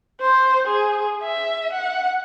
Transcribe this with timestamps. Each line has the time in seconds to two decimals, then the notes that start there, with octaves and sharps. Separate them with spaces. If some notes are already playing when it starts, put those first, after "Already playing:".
0.21 C5
0.67 G#4
1.23 E5
1.73 F#5